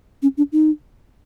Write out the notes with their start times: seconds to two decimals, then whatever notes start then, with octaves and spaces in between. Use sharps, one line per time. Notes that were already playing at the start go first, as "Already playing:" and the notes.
0.22 C#4
0.37 D4
0.52 D#4